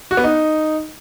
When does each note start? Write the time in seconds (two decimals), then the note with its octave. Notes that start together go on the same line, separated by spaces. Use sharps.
0.11 F#4
0.17 B3
0.24 D#4